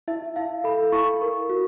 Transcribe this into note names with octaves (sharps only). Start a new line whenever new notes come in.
E4 E5
E4 F5
A4 B5
E4 C#6
A#4
F#4